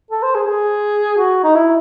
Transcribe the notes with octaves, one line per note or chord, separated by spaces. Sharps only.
A4
C5
G#4
G#4
F#4
D#4
E4